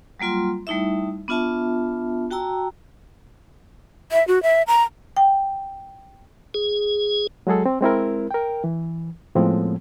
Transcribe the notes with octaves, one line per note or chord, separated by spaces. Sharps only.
F#3 G3 A#3 F4 C6
G3 A3 D#4 E4 E5
B3 D4 F4 E5 A5
F#4 G5 A5 A#5 E6
E5
F#4
E5
A#5
G5
G#4
F#3 G#3 F#4 G#4 A4
C4
G#3 C4 E4 A#4
A#4 G5
E3
A2 F3 G#3 B3 C4